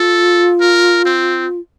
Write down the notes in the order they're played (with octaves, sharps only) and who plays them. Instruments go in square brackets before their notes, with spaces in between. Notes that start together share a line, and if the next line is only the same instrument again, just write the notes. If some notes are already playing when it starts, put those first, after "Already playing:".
Already playing: [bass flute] F4 [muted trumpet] A4
[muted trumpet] A#4
C4